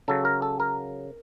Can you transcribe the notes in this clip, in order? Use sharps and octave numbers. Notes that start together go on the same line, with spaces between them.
C#3 F#3 A4
A#4
A4
A#4